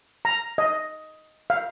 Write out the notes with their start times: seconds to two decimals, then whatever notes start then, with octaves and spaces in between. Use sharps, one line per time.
0.25 A#5
0.58 D#5
1.50 F5